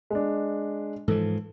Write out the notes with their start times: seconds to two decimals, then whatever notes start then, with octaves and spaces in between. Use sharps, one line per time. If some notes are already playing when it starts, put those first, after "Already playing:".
0.10 G#3 D4
1.08 G#2 E3 F3 A4